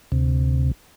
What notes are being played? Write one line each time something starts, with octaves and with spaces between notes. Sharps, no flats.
D2 C3